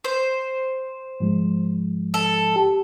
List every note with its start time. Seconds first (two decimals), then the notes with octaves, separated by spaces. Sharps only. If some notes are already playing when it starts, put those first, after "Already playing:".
0.04 C5
1.20 G#2 F3 G#3
2.14 A4
2.56 G4